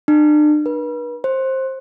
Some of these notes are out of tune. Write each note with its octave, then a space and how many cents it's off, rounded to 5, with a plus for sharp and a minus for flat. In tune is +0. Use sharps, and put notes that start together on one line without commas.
D4 +40
B4 -40
C5 +15